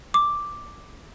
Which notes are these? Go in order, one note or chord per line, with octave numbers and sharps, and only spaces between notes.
D6